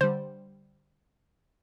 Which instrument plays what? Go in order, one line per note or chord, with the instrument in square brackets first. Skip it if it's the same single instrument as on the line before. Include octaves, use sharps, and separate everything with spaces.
[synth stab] D3 G3 [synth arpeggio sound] C5